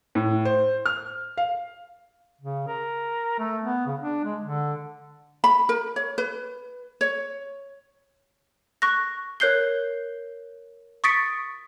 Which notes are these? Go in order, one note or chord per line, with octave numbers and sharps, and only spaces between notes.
A2
C5
F6
F5
C#3
A#4
A3
B3
C#3
D4
G#3
D3
B5
A#4
C#5
B4
C#5
C#6 F#6 A#6
A#4 C#5 F#6 G6 C7 G7
C#6 D#6 A6 B6 C#7 D7